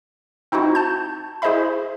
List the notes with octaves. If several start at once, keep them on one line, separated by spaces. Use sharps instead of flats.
C4 D#4 E4 F#4
A5 G6
E4 G#4 C5 D#5 E5 B5